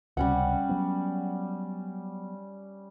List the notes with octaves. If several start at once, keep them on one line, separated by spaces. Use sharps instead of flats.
C#2 C3 G3 C#4 F#5
F#3 B3